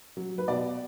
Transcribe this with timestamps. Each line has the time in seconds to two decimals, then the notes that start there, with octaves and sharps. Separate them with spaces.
0.17 F#3
0.38 B4
0.48 B2 D5